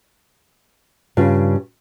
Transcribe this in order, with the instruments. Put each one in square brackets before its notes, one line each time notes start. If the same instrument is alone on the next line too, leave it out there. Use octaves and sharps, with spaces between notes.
[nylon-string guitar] G2 C#3 F4